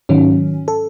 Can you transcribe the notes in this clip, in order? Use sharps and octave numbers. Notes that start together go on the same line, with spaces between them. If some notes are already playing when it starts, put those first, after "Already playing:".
G#2 D#3 F#3 C#4
A4